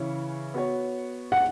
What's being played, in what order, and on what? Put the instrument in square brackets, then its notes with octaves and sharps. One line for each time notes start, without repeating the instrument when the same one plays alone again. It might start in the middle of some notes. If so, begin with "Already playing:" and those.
Already playing: [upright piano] C#3 E3 C#4 E4 C#5
B3 F#4 C#5
[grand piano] F#5